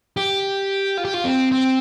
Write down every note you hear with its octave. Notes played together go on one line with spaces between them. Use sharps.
G4
F4
G4
F4
C4
C4